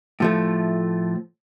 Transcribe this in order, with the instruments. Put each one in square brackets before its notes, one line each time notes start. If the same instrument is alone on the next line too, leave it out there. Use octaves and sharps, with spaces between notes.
[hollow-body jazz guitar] A2 F3 A3